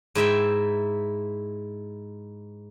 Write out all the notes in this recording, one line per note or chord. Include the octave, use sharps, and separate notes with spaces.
G#2 E4 E5 G5